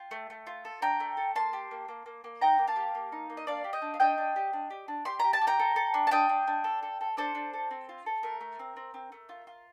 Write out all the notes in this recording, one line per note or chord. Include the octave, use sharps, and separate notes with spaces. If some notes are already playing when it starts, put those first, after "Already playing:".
Already playing: F4 G5
A3
A3
F4
A4
D4 G5 A#5
A3
A4
A#3 A5 C6
G4
A#3
A#3
A#3
A#3
D#4 G5 A#5
A#3
F5 A5
G4
A#3
D#4
A#3
D#5
D4 D5 F5
G4
D#5 G5
D4
F5
D4 D#5 G5
D4
G4
D4
G4
D4
G4 C6
G4 A#5
A5
G4
G5 A#5
A4
A4
D4
A5
D4 D#5 G5
D4
D4
A4
A4
A4
D4 A4 C5
D4
A4
C4
F4
A4
A3 A#4
A3
C4
C4
C4
A3
F4
F4